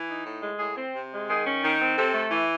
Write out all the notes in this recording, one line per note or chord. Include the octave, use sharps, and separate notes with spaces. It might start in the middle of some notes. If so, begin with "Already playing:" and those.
Already playing: E3
D#4
A2
G#3
A2 G#4
C4
C3
G#3
D#3 G#4
C#4
D#3
C4
C3 A4
A3
E3